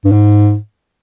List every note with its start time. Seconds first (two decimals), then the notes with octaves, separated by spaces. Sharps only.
0.05 G2
0.12 G#2